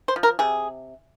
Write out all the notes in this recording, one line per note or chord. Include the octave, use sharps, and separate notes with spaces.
C5
F3
A#4
C3 G#4